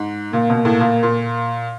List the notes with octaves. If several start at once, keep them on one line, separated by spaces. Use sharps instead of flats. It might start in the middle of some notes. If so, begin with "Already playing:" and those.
Already playing: G#2
A#2 A#3
B2
A2
A#2
A#2